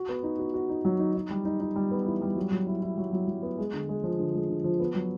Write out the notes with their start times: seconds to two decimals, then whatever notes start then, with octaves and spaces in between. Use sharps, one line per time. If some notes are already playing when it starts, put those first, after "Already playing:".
Already playing: F#4
0.09 B3
0.23 D#4
0.39 F#4
0.54 F#4
0.69 D#4
0.85 F#3
0.99 D#4
1.15 D#4
1.30 G3
1.45 D#4
1.60 D#4
1.76 G3
1.91 B3
2.06 E3
2.22 G3
2.36 F#3
2.52 F#3
2.67 E4
2.82 E4
2.98 F#3
3.13 F#3
3.28 F#3
3.43 B3
3.58 G#3
3.74 D3
3.89 G#3
4.04 F3
4.19 D3
4.34 G#3
4.50 D3
4.64 F3
4.80 B3
4.95 F#3